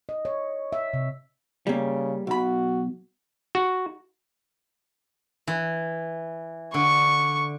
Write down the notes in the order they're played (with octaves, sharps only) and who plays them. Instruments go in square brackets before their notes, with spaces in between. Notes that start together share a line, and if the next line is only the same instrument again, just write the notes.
[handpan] D#5
C#5
E5
C3
[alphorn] C#3 [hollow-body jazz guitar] G3 A#3
[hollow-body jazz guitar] B1 B5 [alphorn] F#4
[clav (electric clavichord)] F#4
[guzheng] E3
[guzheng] D3 [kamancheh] C#6